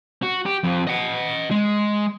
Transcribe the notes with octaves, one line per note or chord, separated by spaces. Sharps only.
F#4
G4
F2
D#5 F#5
G#3